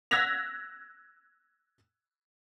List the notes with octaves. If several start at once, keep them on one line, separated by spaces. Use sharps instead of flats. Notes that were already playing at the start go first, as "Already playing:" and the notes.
E6 F#6 G#6 A#6 B6 F7